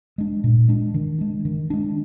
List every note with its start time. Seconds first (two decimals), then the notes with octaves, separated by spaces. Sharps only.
0.18 G#3 D4
0.44 A#2
0.68 G#3 D4
0.94 D#3
1.19 G#3 D4
1.45 D#3
1.70 G#3 D4